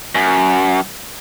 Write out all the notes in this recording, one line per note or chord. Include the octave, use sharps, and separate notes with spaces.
F#2